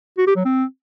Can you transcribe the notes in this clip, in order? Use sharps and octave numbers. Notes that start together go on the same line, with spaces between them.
F#4
G4
F#3
C4